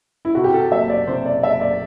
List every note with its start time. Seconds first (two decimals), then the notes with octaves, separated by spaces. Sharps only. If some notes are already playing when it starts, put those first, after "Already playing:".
0.25 E4
0.35 C3 F#4
0.44 G4
0.54 A4
0.72 F#1 E5
0.90 D5
1.07 C3 C5
1.26 D5
1.43 F#1 E5
1.61 D5